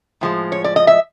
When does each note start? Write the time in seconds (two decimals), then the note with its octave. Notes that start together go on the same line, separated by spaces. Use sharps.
0.21 A2 F3 G#3
0.52 C#5
0.64 D5
0.76 D#5
0.87 E5